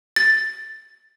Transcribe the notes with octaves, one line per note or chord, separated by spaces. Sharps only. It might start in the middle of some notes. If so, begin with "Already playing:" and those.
A6